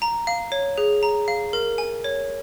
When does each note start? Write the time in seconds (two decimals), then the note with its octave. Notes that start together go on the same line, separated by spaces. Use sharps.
0.02 A#5
0.27 F5
0.52 C#5
0.78 G#4
1.03 A#5
1.28 F5
1.53 A#4
1.78 G#5
2.04 C#5